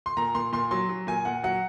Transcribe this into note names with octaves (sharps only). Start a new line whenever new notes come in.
C6
A#2 A#5
A#2 C6
A#2 C6
F#3 C6
F#3
A#2 G#5
A#2 F#5
F#3 F#5